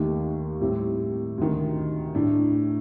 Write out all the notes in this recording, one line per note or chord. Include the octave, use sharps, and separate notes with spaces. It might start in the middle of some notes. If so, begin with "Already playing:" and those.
Already playing: D#2 D#3 A3 D#4 G4
A2 G3 C4 G4
D2 C3 D#3
A2 A3 D4